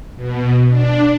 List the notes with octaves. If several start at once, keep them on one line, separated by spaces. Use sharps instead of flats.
B2
D4